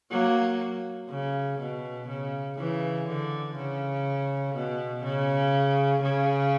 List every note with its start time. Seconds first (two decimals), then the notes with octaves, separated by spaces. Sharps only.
0.11 F#3 A#3
1.09 C#3
1.60 B2
2.08 C#3
2.58 C#3 E3
3.07 D3
3.56 C#3
4.55 B2
5.04 C#3
6.02 C#3